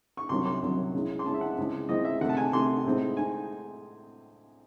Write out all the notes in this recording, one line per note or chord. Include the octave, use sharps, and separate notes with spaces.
C#6
C2 C3 D#3 F#3 C#4 C6
C6
C2 C3 D#3 F#3 C#4
C#3 G#3 C#4 E4
C6
C#3 G#3 C#4 E4 A5
E5
F#5
C#2 C#3 G#3 C4 E4
C#2 C#3 G#3 C4 E4 D#5
E5
C3 D#3 A3 F#5
A5
G#5
C3 D#3 A3 C6
A2 G#3 C4 D#4
D#4 G#5